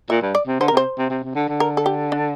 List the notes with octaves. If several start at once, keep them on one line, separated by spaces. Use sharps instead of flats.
A#2 E5
G2
D5
C3
D3 C5
A#4
C3 C5
C3
C3
C3
D3
D3
A#4
A4
G4
D4